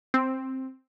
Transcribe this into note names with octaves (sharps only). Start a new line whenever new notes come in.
C4